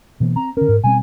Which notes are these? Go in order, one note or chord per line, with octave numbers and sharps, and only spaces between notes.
B2 E3 A#3
C4 A#5
D3 C#4 A#4
G#2
B2 G3 C4 G#5